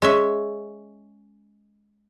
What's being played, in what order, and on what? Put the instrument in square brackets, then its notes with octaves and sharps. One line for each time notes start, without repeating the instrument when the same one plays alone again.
[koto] G#3 C#4 E5